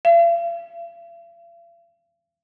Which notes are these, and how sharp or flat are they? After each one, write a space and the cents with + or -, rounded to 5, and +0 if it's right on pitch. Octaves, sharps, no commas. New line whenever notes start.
F5 -45